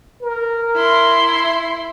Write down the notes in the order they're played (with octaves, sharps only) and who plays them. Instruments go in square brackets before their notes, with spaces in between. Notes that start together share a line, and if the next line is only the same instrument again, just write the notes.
[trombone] A#4
[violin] E4 C6